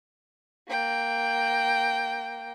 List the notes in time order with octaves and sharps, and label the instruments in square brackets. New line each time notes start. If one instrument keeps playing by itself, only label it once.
[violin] A#3 G5